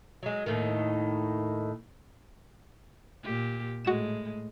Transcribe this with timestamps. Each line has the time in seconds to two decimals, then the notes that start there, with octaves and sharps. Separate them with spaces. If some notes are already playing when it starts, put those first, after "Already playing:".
0.23 F#3 G#3
0.46 D#2 A2 D#3
3.23 A#2 G4
3.85 A2 G#3 F#4 E7